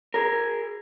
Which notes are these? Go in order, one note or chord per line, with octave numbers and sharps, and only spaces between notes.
G#4 A#4